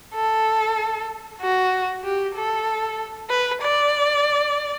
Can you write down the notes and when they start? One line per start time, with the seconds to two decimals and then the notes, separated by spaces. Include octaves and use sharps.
0.15 A4
1.41 F#4
2.04 G4
2.35 A4
3.30 B4
3.62 D5